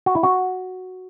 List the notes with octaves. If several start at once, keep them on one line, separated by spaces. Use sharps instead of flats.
F#4
E4
F#4